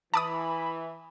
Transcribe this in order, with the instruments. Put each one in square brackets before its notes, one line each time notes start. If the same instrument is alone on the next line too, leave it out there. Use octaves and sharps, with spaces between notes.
[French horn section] E3 [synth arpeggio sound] A5 D6 D#6 [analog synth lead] B5